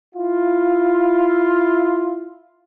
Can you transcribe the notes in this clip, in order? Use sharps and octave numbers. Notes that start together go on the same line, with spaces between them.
E4 F4